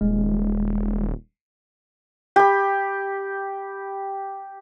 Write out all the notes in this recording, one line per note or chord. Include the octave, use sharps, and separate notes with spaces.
D#1 G#3
G4 B5